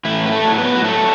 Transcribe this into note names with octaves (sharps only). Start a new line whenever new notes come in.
A2 E3 E4
B4
A3 A4
F#3
B3 B4
F#4
F#3 A3 A4